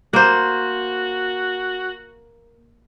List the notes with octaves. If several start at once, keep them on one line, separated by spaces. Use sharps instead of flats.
A#3 F#4 C5